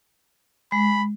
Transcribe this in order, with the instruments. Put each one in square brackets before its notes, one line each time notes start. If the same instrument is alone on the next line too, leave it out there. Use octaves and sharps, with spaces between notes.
[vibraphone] G#3 [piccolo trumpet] B5